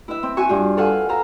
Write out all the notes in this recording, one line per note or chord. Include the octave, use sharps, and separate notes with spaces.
E4 B4 E5
C4
F#4 G#5 C#6
G2 F4
A4 B4 F5 F#5 G#5
A4 B4 F5 A#5